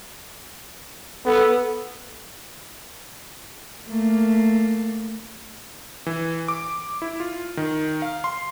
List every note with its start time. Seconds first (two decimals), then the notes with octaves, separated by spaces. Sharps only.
1.25 B3 A4
3.89 A3 A#3
6.06 E3
6.48 D6
7.02 E4
7.20 F4
7.57 D#3
8.02 F5
8.24 C6